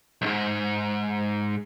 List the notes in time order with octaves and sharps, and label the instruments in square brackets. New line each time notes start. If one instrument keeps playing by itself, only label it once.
[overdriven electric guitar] B1 G#2